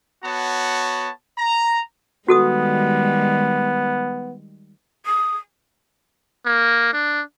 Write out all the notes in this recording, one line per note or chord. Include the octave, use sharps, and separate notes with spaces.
B3 F#4 C#5 A5
A#5
D#3 G3 G#3 B3 F#4 A4 D#6
D#6
A#3
D4